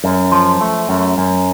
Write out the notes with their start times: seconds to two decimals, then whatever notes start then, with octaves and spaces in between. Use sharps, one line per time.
0.04 F#2
0.32 F3
0.61 A3
0.89 F#2
1.18 F#2